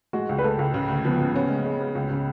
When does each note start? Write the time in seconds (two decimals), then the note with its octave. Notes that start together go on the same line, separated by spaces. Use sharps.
0.13 G#3 F#4
0.29 C#2
0.38 B4
0.44 G#3 A4
0.59 C#2
0.74 C#3
0.89 D2
1.05 F3 B3
1.20 C#3
1.34 B3 C#4
1.50 G#3
1.65 G#3
1.80 B3
1.95 C#2
2.11 C#3